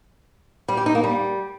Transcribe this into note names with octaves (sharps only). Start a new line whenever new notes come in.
G3
G4
D#4
A#3
G3